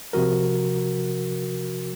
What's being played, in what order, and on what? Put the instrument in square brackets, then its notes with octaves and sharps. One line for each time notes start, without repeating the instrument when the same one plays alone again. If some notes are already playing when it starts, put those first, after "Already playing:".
[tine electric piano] C3 F3 F#4 A#4